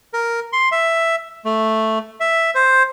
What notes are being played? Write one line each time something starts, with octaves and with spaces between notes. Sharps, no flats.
A#4
C6
E5
A3
E5
C5